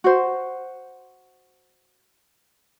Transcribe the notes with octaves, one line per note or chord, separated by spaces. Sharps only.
F#4 C5